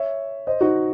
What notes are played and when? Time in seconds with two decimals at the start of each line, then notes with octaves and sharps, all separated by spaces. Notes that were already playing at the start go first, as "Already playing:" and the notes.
Already playing: C#5 E5
0.47 C5 D#5
0.61 D#4 F#4